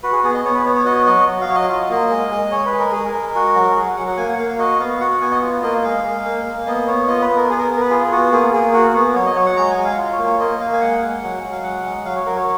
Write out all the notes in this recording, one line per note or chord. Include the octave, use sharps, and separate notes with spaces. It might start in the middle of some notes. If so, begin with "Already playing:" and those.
F#4 B4
G#4
B3 G#4
D#5
B3 C#5
B4
B3 C#5
C#5
F#4 D#5
F#3 D#5
F#3
F5
F#3 C#5
D#5
F4
A#3
G#3
G#3
G#3 C#5
B4
G#3
A#4
G#3 G#4
A#4
G#3
F#4
F#3
F#3 G#4
F#3 F#5
F#5
A#3 G#5
F#5
A#3 F5
F5
F#4 D#5
B3 F5
F#4 F#5
F#5
B3 G#5
D#5
F4
A#3 D#5
D#5
G#3 F5
G#3
A#3
A#3
B3 D#5
B3 C#5
F4 D#5
B4
B3
A#4
B3 G#4
A#4
B3
A#4
B4
F4 G#4
B3 F#4
A#3 G#4
A#3 G#4
F#4
B3
F#3 C#5
D#5
F#3 C#5
F#5
G#3 A#5
G#5
G#3
F5
F4
C#5
A#3
C#5
A#3 D#5
A#3 F5
G#5
G#3 F#5
G#3
F#3
F#3
F5
G#3 F#5
G#3
F#3 F5
C#5
F#3 A#4
C#5